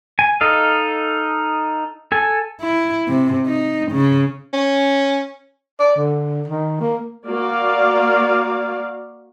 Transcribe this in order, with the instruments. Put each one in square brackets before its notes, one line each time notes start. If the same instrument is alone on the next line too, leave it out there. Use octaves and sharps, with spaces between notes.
[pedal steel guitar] G#5
D#4 A4 D#5 F5
A4 G#5
[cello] E4
C3
D#4
C#3
[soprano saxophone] C#4
[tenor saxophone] D5
D3
D#3
A#3
[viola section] A#3 F#4 D5 F5